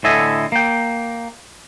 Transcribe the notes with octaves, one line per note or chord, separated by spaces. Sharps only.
A2 D3 A4 D#5 E5 G#5
A#3 G5